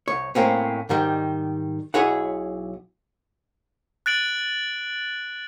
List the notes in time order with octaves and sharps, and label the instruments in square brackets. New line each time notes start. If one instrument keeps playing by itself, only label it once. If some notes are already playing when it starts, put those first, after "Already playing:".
[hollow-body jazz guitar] C2 C#5
A2 A#3 C4 C#4
G#2 D#3 G3
B1 E4 G#4 C#5 F#5
[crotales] F#6 A6 D7 F#7